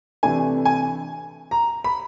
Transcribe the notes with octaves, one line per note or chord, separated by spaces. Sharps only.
C3 E3 A3 D4 G#5
G#5
A#5
B5